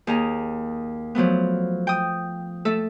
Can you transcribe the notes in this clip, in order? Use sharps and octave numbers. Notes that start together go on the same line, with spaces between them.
D#2 G#4 A#5
F3 F#3 A3 B3
G5 D#6
A3 A4 E5